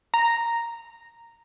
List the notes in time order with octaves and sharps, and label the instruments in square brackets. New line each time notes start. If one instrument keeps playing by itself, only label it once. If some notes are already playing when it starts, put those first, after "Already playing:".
[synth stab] A#5